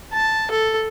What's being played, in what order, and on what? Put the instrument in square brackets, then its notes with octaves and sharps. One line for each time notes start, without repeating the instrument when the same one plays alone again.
[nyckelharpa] A5
A4